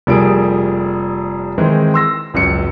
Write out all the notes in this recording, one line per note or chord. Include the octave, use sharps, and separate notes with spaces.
F1 F3 G3 A#3 G#4 D7
D#3 E3 G#3 C4
C6 E6 A#6
G#1 C#2 F#2 C#7